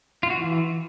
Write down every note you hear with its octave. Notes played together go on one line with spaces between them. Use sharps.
F4
F#4
E3